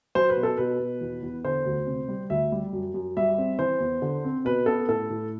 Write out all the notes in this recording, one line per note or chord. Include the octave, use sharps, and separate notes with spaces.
F#3 C5
B4
B2
A4
B2 B4
B2
E2
E2
D3 C5
D2
C3
G3
D2 E5
G3
F#2
F#2
G3 E5
C4
E3 C5
E2
D3
C4
B2 B4
B3 A4
A2 A4
A2